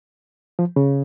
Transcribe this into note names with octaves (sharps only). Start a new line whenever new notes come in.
F3
C#3